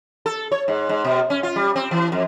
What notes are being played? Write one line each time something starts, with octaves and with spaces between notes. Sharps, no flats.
A4
C#5
G#2
G#2
B2
C#4
F4
G3
C4
E3
F2